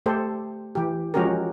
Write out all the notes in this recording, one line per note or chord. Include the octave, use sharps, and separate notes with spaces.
A3 G4 A4 C5
E3 G4
F3 G#3 C#4 F#4 G4 A#4